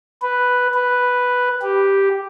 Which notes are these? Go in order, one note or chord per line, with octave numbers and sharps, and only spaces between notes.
B4
B4
G4